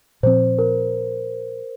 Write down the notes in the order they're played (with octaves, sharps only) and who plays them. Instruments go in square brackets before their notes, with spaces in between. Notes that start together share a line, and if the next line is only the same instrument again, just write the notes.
[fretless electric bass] A#2 F3 C4 [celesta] C5
[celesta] A#4